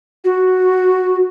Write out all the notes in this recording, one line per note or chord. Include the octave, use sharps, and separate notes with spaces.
F#4